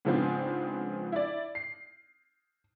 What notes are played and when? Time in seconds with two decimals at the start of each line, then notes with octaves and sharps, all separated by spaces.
0.05 G#2 C#3 F3 B3 C4 D4
1.12 E4 D5
1.55 C7